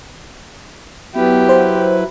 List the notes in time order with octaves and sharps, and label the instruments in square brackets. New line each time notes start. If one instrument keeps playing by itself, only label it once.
[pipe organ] F#3 E4 B4 [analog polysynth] B3 [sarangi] G4
[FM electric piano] C5